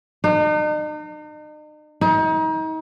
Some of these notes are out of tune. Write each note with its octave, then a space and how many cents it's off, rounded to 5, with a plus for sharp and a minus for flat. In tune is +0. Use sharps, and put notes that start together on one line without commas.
D#4 -40
D#4 +35